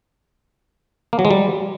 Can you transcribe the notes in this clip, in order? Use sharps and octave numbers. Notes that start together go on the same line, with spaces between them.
A#3
F#3
G#3
G3